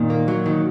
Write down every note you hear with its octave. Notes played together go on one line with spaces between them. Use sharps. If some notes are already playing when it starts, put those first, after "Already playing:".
Already playing: A#2 D#3
A#3
F#3
D#3